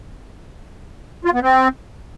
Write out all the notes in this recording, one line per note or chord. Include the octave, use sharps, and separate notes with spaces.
F4
B3
C4